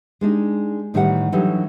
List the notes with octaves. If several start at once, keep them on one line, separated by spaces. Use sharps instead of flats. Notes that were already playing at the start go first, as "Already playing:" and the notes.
G#3 D4 D#4 G4
A2 D#3 E3 G3 E5 F#5
D3 E3 F#3 G3 D#4 G4